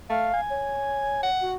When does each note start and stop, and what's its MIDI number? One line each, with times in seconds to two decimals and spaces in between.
0.10 0.29 57
0.10 0.41 77
0.34 1.18 80
0.50 1.29 73
1.23 1.52 78
1.41 1.57 66